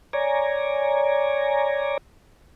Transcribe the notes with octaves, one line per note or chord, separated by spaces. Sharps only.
C#5 D5 G#5 A#5